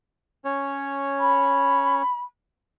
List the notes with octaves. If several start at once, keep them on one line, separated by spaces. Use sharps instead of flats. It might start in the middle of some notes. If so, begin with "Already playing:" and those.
C#4 C#5
B5